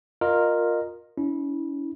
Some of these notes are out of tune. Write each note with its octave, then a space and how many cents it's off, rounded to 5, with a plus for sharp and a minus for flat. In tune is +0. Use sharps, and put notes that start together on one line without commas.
F4 +15 A#4 +0 D#5 -20
C#4 +30 E4 -20